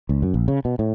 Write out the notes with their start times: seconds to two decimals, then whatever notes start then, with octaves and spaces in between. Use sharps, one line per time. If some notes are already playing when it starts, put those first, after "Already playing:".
0.09 C#2
0.22 F#2
0.34 A#1
0.48 C#3
0.65 B2
0.79 A2